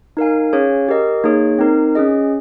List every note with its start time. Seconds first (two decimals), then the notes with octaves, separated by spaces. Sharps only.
0.17 D#4 A#4 F5 G#5
0.53 C#4 G#4 C#5 F5
0.88 G4 A#4 D#5
1.24 A#3 D#4 G#4 C#5
1.59 C4 D#4 A#4
1.95 C#4 G#4 D#5